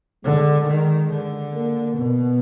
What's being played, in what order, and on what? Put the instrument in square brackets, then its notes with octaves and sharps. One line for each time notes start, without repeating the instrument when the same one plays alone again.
[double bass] D3 [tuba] G#3
[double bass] D#3 [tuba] G#3
[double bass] D3
[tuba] A#3
[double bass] B2 [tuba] B3